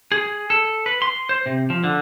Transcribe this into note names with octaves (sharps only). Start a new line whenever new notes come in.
G#4
A4
B4
C6
C5
C3
F3
D3